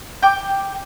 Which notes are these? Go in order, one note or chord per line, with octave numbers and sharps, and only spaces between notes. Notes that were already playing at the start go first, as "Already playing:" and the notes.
G5 D6